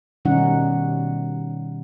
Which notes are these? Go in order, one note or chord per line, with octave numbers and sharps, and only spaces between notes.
B2 D#3 G3 C#4 D#4 F#5